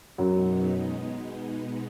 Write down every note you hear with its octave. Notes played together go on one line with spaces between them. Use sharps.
F#2 B2 F#3 G#3 B3 D#4